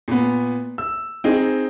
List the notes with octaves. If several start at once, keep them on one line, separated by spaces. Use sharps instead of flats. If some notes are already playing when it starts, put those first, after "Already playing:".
A#2 B3
E6
C4 D#4 G#4